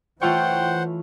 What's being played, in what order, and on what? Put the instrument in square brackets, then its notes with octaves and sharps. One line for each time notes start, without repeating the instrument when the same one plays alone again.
[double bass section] E3 [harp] A3 F4 C#5 [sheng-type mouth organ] C5 F#5 [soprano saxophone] G5